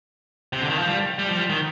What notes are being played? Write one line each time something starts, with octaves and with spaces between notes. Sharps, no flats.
C3
D3
D#3
F3
G3
G3
F3
G3
D#3